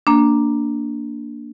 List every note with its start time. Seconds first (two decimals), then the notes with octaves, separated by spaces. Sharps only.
0.07 A#3 D4